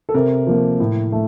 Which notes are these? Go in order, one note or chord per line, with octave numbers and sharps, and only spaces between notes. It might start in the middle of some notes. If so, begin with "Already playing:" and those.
A4
C3 A#4
F3 A#3
A2
A3